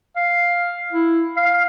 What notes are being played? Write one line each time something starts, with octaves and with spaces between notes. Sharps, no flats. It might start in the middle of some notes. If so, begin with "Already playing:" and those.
F5
E4
F5